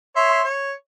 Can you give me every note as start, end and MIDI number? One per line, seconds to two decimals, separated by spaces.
0.16 0.43 73
0.16 0.43 76
0.16 0.43 84
0.44 0.72 73